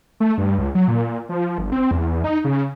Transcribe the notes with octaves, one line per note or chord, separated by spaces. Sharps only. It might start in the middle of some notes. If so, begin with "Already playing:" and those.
A3
G2
C#2
F#3
A#2
F3
G1
C4
E2
D#4
C#3